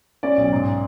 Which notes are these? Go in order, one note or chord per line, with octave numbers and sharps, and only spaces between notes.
C#4 D5
B1
G#2